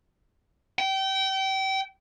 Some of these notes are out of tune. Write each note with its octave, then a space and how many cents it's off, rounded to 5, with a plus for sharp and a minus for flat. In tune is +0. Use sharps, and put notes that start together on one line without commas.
G5 -30